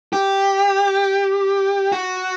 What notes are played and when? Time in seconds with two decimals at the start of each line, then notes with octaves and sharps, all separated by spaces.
0.13 G4
1.92 F#4